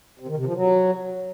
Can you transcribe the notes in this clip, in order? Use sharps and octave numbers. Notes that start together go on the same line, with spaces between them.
C3
D#3
C3
F3
F#3